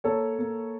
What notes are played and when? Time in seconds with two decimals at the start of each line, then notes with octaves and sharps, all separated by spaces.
0.04 A#3 A4 C#5
0.39 A#3